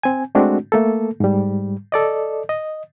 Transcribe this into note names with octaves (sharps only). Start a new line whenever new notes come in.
C4 G#5
G#3 A3 C4 D4 F#4
A3 A#3 A4
G#2 G3
A4 D5 D#5
D#5